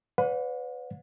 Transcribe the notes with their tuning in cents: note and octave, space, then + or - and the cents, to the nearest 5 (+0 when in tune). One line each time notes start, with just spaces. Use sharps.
B4 +25 D5 -40 F#5 -40